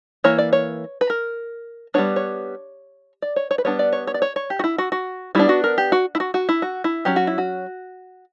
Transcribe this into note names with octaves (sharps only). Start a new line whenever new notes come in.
E3 A#3 C#5
D5
C#5
B4
A#4
G3 B3 D4 C#5
C#5
D5
C#5
C#5
B4
G3 B3 D4 C#5
D5
C#5
C#5
D5
C#5
C#5
G4
F#4
E4
F#4
F#4
G3 B3 D4 E4
F#4
A#4
G4
F#4
E4
F#4
F#4
E4
F#4
E4
F#3 C#4 G4
F#4
E4
F#4